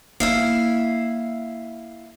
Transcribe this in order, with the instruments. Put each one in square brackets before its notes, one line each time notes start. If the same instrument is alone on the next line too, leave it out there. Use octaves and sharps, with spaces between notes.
[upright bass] A#3 [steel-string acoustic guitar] E4 E5 F5